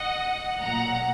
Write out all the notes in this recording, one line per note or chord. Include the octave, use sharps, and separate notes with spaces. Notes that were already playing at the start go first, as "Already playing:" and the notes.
Already playing: D#5 F#5
B1 A#2 F#5 A#5